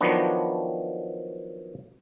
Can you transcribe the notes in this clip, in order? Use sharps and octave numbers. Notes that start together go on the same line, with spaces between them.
D#3 F3 F#3 B3 D4